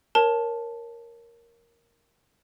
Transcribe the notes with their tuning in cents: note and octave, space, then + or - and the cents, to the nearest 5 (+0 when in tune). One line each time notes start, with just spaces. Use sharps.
A#4 +0 C#5 -20 A5 -5